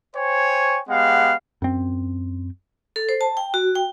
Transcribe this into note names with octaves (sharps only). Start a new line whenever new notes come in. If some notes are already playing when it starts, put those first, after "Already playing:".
C5 C#5 G5 G#5 C#6
G#3 B3 G4 F5 F#5
F#2 C4
A4
C5
A5
G5
F#4
G5